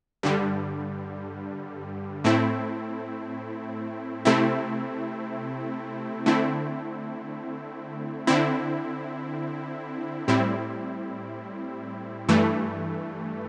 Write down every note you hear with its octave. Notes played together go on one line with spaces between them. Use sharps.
G2 D3 G3
A2 A3 C4 E4
C3 A3 C4 E4
D3 A3 C4 E4
D3 C4 E4
A2 G3 C4 E4
G2 E3 A3